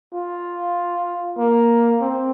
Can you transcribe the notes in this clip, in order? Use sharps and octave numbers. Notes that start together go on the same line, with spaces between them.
F4
A#3
C4